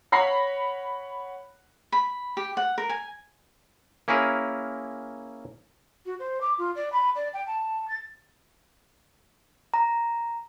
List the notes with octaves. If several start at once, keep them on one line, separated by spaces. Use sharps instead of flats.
C#5 F#5 B5 A#6 C7
B5
G4
F#5
A#4
G#5
A#3 C#4 E4 G#4 A#4
F#4
C5
D6
F4
D5
B5
D5
G5
A5
A6
A#5